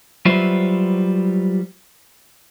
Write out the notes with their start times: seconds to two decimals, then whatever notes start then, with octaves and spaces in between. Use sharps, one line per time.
0.25 F#3 G3 F4 B4 C5 E5